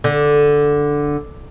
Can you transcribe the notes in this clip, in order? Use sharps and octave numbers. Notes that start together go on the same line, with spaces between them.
D3